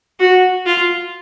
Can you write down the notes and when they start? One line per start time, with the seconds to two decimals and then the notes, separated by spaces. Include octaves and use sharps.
0.20 F#4
0.66 F4